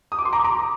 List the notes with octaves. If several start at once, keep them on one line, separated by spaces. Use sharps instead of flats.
D#6
D6
C6
A#5 D6
A#5 D6